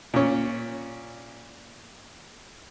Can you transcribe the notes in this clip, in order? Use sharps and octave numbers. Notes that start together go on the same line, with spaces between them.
A#2 C#4